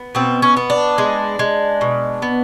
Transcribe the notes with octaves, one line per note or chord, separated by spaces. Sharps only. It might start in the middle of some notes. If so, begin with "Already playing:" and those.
Already playing: B3
B2 C4
C#4
B3
D4
G#3
G#3
B2
B3